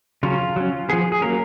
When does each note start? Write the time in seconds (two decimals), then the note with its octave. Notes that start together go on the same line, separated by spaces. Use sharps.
0.23 C#3 F#3 C#4 F4
0.56 F#3 C#4
0.89 F3 B3 G#4
1.12 G#4
1.22 F#3 A#3 C#4 A#4